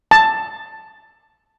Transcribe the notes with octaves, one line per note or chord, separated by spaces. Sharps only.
A5